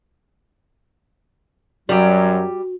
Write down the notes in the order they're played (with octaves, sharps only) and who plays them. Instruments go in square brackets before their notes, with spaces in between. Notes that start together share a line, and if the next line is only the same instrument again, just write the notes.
[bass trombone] F#2 [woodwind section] F#3 [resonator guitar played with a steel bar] G3 G4 [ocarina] F#4